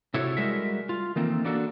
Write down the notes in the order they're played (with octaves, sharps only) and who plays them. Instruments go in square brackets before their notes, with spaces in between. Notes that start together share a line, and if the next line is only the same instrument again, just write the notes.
[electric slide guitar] C3 E4 F#4 A4 C#5
G3 G#3 F#4 A#4 E5
F4
D#3 E3 A3 A#3 C4
A#3 D4 F#4 A4